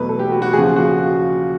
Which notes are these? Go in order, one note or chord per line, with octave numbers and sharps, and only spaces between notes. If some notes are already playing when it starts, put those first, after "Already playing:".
Already playing: E2 B2 F#3 A3 B4
A4
G4
F#4
F#4
D#2 C#3 F3 G#4
F#4